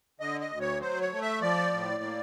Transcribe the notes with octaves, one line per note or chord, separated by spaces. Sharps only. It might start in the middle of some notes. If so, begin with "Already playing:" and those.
D3 D#5
D#5
D2
C#5
F#3 C5
C#5
A3
E5
F3 D5
A2
A#3